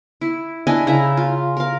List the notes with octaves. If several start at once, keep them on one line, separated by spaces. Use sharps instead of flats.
E4
D4 E4 D#5 G#5
C#3 E4 E5 A#5
F4
A#4 F5